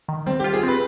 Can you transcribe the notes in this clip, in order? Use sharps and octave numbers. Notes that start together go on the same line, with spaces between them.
D#3
G3 C4
G4
F4
G#4
C4 B4